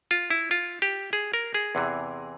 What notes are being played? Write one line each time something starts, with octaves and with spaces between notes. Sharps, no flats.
F4
E4
F4
G4
G#4
A#4
G#4
E2 C3 E3